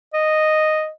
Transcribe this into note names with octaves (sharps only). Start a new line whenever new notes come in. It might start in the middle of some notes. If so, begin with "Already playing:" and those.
D#5